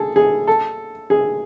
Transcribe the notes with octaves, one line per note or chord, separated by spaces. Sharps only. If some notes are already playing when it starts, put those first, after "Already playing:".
Already playing: G#4 A4
G#4
A4
G#4